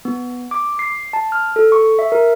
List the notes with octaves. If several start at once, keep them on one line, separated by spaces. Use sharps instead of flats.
B3
D6
C7
A5
F6
A4
C#6
E5
A#4